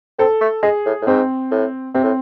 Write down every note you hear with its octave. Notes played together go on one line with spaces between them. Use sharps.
C4 A4
A3
G#3 G#4
A2
A2
G#2 C4
A2
C3 C4
A2